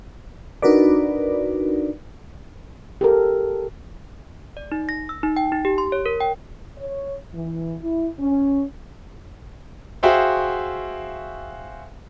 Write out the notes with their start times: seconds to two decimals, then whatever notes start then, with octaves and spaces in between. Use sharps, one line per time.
0.62 D4 D#4 F#4 A#4 B4 D5
3.01 G4 A4 A#4
4.57 D5
4.72 D#4
4.89 A#6
5.09 E6
5.23 D#4
5.36 G5
5.52 D#4
5.65 G4
5.78 C6
5.92 C#5
6.06 A#4
6.20 G5
6.77 C#5
7.34 E3
7.81 E4
8.20 C#4
10.03 F#4 G#4 C5 E5 F5 G5